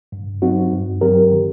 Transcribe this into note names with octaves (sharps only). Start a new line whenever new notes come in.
G2
F#3 C4 D#4 F#4
G2
F#3 C4 G4 A#4
D#3